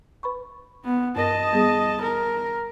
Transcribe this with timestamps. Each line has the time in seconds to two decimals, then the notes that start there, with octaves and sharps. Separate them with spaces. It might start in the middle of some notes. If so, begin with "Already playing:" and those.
0.23 B4 B5 C#6
0.84 B3
1.16 G2 A#4 D#5 A5 A#6
1.53 G3 B3 G#4
2.02 A#4